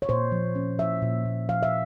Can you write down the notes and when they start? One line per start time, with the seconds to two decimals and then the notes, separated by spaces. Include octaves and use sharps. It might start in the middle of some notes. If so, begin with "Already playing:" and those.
0.02 C#5
0.09 A#2 C5
0.32 F3
0.55 C#4
0.78 F3 E5
1.02 A#2
1.25 A#2
1.49 F3 F5
1.63 E5